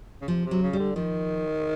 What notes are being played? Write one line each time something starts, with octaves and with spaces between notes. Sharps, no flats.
C#3
C3 F3
C3
F#3
C#3
G3
D3
D#3 F3